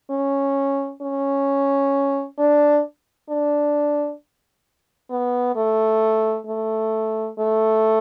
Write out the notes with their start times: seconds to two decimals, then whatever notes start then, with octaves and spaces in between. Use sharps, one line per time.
0.10 C#4
1.02 C#4
2.38 D4
3.29 D4
5.10 B3
5.56 A3
6.47 A3
7.39 A3